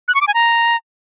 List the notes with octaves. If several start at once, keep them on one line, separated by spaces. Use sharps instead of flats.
F#6
C#6
D6
G#5
A#5